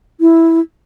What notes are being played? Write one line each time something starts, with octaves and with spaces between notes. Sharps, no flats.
E4